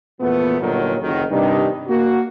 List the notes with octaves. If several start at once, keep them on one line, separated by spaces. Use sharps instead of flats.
E2 A#2 F3 A3 B3
G1 A#2 D3 D#3 F#3
F#1 D#3 F#3
G2 C3 D#3 G3 D4 D#4
A#3 F#4